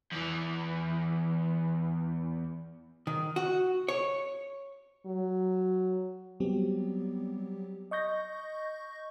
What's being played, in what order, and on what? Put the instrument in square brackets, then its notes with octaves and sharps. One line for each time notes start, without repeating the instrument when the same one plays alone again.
[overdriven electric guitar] E2 E3
[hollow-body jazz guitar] D#3
F#4
C#5
[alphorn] F#3
[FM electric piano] F#3 G3 B3 C4 G4
D#5 C#6 G6 A#6